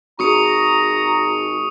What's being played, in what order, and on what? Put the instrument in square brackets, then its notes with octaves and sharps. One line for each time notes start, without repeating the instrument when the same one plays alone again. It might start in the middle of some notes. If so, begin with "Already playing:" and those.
[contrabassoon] G#1 [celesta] F#4 G#4 [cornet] A#5 [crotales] C#6 D#6 C#7